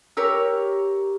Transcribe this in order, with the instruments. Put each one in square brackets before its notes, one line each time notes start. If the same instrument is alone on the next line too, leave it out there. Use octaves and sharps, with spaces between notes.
[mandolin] G4 A#4 C#5 E6